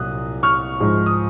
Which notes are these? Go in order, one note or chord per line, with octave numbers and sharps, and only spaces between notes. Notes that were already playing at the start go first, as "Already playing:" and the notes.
Already playing: C2 A#2 F#3 D#6 F#6
C#6 F6
G#2 F3 G#3
D#6